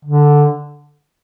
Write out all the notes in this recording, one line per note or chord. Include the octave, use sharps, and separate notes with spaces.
D3